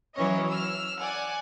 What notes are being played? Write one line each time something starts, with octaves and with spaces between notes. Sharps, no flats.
E3 F#3 C#4 C#5 D#5
E6 F6
D5 F#5 G#5